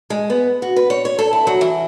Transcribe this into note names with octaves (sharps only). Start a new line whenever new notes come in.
G#3
B3
F#4
B4
C#5
C#5
A4
E4
F#3
E3